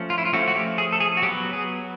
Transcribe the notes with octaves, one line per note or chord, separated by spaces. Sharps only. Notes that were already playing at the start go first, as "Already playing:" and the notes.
Already playing: F3 A3 C#4
F4
E4
F4
F3 A3 C#4 F#4
F#4
G4
G#4
A4
G#4
F#4
F#3 G4
B3
G#4